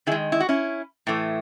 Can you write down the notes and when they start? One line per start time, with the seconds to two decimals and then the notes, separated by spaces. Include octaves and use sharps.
0.07 D#3 E4 G#4
0.11 G#3
0.32 E4
0.40 F#4
0.49 C#4 E4
1.07 A2 E3 A3